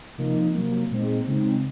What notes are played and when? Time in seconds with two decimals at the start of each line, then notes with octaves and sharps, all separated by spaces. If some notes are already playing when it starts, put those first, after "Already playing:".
0.18 C3 F3 A#3 D#4
0.54 C3 F#3 A#3
0.91 A#2 G#3 C4 D#4
1.27 C#3 G#3 C4 D#4